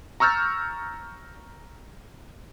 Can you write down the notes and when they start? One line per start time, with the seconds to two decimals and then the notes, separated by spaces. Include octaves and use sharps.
0.20 A#5 C#6 E6 F6 G6 A6